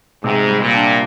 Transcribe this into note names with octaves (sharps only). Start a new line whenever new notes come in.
G#2 C3
G3
A#2
D4